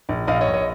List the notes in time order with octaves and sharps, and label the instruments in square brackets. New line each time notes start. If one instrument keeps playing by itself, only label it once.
[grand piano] A#1
A#1 D#5 F5
C#5 D#5
A#1
C#5 D#5